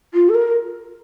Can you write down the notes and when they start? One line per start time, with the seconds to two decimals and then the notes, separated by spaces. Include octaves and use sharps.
0.14 F4
0.29 A4
0.34 A#4